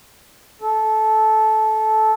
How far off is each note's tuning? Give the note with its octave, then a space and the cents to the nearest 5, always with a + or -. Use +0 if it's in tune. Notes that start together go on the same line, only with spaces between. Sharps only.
A4 -15